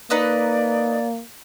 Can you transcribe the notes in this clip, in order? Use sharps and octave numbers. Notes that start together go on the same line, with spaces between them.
A#3 D#4 B4 D5 D#5